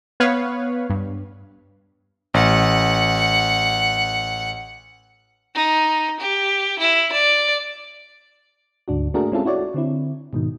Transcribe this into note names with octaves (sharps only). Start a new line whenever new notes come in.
B3 B4 C#5 F5
G2
A1 F#5
D#4
G4
E4
D5
D2 G#2 D4 F#4
A3 A#3 D4 F#4 G#4 A#4
G#3 C4 C#4 E4 F4 A4
E4 F#4 C#5 D5
D3 C4 E4
G#2 B2 D#3